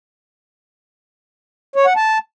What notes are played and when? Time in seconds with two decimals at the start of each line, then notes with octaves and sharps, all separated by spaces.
1.76 C#5
1.86 F#5
1.96 A5